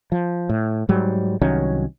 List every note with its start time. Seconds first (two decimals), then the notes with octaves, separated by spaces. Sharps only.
0.12 F3
0.49 A2
0.89 G#2 F#3 G3
1.42 C2 D#3 F#3 C#4